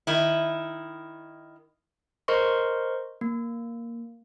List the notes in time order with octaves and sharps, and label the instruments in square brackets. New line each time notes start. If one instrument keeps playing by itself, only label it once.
[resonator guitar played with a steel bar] D#3 E4
[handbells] A#4 C5 D#5 C6 C#6
A#3